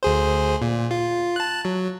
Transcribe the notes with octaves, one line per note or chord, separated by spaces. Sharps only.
D2 G#4 C5
A#2
F4
A5 F#6
F#3